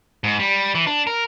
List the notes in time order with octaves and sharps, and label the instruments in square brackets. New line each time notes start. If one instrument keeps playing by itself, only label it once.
[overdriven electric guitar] G#2
G3
E3
D4
A#4